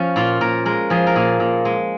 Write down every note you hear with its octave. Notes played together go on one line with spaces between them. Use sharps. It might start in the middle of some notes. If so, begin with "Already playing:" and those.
Already playing: F3 C#4
A#2 F4
A#2 A#4
G#3 A#4
F3 G#4
A#4
A#2 G#4
A#2
G#3